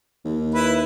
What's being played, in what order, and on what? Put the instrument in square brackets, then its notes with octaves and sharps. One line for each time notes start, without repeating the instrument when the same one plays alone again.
[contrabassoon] D#2
[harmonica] E4 B4